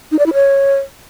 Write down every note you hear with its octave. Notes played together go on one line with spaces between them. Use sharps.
D#4
D5
E4
C#5